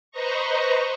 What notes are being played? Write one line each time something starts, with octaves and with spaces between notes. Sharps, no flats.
B4 C5 D#5 A#5 C#6